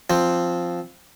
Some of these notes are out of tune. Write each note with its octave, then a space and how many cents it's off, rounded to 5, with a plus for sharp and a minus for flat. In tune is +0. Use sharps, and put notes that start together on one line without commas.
F3 +0 C4 +0